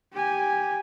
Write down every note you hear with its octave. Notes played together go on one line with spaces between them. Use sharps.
G4 G#5